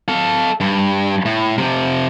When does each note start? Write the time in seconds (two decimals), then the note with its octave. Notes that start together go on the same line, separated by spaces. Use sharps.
0.09 A4 F5
0.60 G2
1.25 A2
1.58 C3 F3